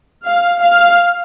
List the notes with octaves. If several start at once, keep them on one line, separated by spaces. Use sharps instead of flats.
F5
F5